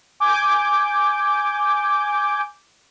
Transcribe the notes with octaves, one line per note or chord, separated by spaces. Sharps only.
G#5 D6 G6